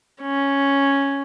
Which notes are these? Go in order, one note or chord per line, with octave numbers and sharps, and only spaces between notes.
C#4